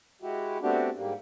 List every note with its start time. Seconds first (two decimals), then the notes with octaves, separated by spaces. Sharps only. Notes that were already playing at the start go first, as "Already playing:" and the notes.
0.22 G#3 E4 F#4 G4
0.62 A3 B3 C4 D4 F#4 G4
0.96 G#2 G3 A#3